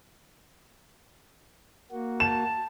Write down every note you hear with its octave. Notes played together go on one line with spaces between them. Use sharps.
A#3 F#4
A5 E7